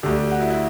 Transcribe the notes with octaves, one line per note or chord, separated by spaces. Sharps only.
D2 D3 G4
G4
F#4
E4
E4